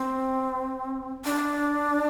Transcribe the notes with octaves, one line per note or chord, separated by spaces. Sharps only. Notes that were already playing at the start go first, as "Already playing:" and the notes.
Already playing: C4
D4